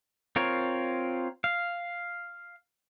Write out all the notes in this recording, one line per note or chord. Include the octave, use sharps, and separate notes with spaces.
C4 F4 A#4 C#5
F5